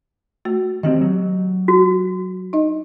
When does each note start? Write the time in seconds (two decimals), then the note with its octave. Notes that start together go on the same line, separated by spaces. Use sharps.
0.45 A3 F#4
0.83 D#3 C4 G4 D#5
1.01 F#3
1.68 F#4
2.53 D#4 D#5